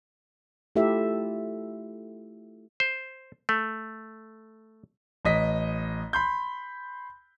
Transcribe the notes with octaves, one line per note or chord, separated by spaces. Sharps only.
A3 E4 F4 G4 A4 E5
C5
A3
A1 D#5 B6
B5 C6 G6